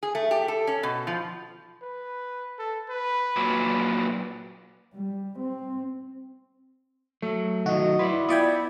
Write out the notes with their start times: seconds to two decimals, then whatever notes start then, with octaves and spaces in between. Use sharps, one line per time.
0.03 G#4
0.15 A3
0.31 G4
0.48 A4
0.67 C#4
0.83 B2
1.07 F3
1.82 B4
2.59 A4
2.90 B4
3.36 A#2 F#3
4.94 G3
5.39 C4
7.22 F#3 A3
7.66 D#3 F#3 F#4 D#5
7.99 E4 B4 C#5 D5 C6
8.29 B3 E4 F4 D5 G5 D#6 G#6